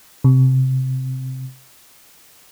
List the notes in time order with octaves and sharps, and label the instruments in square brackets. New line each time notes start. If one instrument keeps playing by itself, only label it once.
[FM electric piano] C3